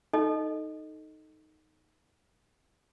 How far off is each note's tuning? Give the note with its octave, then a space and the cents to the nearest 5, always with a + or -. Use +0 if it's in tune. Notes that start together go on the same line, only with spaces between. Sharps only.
D#4 +0 A4 +0 D#5 +0